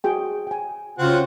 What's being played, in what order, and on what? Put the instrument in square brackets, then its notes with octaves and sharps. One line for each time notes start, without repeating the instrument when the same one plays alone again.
[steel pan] F#4 G#4 G5
G5 G#5
[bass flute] C#3 [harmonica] C4 F#4 F#5 [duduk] F4